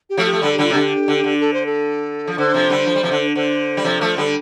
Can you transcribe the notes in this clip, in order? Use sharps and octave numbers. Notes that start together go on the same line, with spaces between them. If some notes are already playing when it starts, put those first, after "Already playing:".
G4
F3 A3
G4
A3
D3 G3 A4
G4
D3 G3 F4
C3
D3 G4
D3
D3
A4
C5
A4
F3
D3 C5
C3 F3
D3 G3
F3
G3
C3 F3
D3
D3 C5
G3
C3 F3
F3 A3
D3 G3